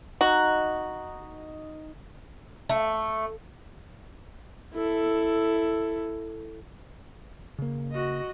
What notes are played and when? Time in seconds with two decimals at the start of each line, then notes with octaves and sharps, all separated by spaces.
0.21 D#4 F#4
2.69 A3
4.74 E4 A4
7.59 C#3 A#3
7.91 F#4 D#5